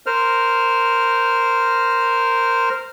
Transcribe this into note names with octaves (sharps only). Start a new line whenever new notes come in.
A#4 C5 F6